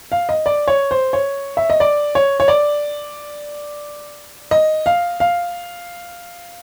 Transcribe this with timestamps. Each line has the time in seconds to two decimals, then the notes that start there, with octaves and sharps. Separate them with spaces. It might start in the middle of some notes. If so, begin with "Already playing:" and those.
0.12 F5
0.29 D#5
0.46 D5
0.68 C#5
0.91 C5
1.13 C#5
1.57 E5
1.70 D#5
1.80 D5
2.15 C#5
2.40 C#5
2.48 D5
4.51 D#5
4.86 F5
5.20 F5